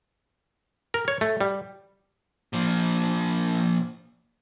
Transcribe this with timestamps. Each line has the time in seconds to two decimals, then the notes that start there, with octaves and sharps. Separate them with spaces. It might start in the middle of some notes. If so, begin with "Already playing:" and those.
0.94 A#4
1.08 C#5
1.21 A3
1.41 G3
2.53 A#2 F3